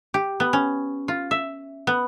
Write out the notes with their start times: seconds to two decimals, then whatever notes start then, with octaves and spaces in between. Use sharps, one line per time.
0.14 G4
0.40 B3
0.53 C#4
1.08 F4
1.31 E5
1.87 B3